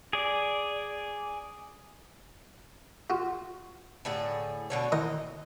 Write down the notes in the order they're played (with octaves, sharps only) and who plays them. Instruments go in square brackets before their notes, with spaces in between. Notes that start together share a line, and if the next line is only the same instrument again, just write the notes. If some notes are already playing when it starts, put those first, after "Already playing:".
[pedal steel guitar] G#4 D5
[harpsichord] F4 F#4
[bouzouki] A2 D3 G#4
B2 D3 C#5
[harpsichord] D#3 E3 D#4 [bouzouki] D#5